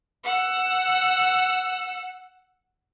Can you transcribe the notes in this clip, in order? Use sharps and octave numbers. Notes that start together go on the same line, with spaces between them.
F#5 E6